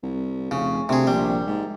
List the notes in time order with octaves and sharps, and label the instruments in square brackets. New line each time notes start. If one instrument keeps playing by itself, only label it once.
[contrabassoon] C2
[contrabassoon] F1 [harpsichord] C#3
[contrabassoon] D2 [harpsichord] C3 G#4
[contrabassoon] A#1 [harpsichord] G3
[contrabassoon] G#2